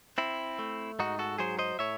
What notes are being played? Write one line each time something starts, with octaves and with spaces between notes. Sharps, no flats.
C4 E4
A3
G#2 D#4 F#4
F#4 A4
F#3 G#4 C5
C5 D#5
A2 C#5 E5